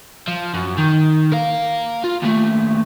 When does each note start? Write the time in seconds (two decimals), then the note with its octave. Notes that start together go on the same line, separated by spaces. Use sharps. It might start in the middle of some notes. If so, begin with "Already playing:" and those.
0.28 F3
0.54 F#2
0.78 D#3
1.32 A#4 F5
2.04 F4
2.22 D#2 A3